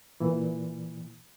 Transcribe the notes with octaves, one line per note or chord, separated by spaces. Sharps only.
A#2 E3